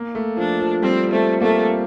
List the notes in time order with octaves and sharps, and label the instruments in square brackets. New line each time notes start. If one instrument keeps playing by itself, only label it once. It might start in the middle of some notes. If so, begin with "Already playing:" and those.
Already playing: [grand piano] A#3
A3
[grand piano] F3 [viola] D4
[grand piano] F3
[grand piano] G3 [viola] C4
[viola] A3 [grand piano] C4
[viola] A3 [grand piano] A#3